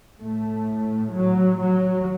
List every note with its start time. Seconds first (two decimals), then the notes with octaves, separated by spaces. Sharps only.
0.19 A2 A3
1.14 F#3
1.61 F#3